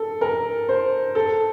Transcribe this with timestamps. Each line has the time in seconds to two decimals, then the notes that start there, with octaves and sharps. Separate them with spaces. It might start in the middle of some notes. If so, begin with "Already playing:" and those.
Already playing: A4
0.21 A#4
0.69 C5
1.15 A4